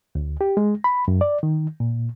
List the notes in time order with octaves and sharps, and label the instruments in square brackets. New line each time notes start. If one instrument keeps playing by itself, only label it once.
[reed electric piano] D2
G4
G#3
B5
F#2
D5
D#3
A#2